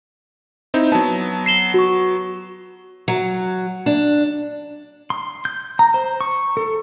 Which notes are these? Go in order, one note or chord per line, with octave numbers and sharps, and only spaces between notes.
C4 D#4 E4
F#3 B3 A5
C7 E7 G7
F#4 C#6
F#3
D4
C6
G6
A#5
C5
C#6
A4